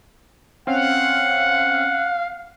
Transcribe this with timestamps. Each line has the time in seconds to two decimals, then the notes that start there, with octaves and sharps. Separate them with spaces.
0.67 C4 C#4 F5 F#5